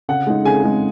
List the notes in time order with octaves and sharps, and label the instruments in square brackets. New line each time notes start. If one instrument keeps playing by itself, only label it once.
[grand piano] C#3 F#5
G#3 D#4
C#3 G#4 G#5
G#3 D#4